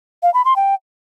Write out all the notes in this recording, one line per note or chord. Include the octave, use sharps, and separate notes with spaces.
F5
B5
C6
G5